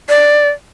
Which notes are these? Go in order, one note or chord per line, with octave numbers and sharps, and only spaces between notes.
D5